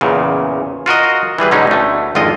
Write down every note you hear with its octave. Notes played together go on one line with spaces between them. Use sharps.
E2 A#2 C#3
F4 F#4 A#4 D#5
E3 G3 G#4 B4
B2 D3 G#3 C#4 D#4
D2 A3
G#1 F2 D3 F4 D#5